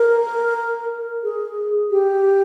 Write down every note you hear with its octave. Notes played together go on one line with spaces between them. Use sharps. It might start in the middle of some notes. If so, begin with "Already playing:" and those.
Already playing: A#4
G#4
G4